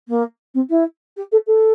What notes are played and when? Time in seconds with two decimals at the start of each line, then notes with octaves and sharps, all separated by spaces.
0.08 A#3
0.54 C4
0.69 E4
1.16 G4
1.32 A4
1.47 A4